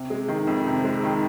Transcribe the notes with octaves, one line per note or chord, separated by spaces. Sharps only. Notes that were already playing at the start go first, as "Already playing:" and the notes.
Already playing: C3
G#3
D#3
F2
C3
G#3
D#3